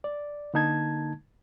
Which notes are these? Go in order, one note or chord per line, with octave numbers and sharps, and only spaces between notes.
D5
D3 A#3 D#4 A5 G#6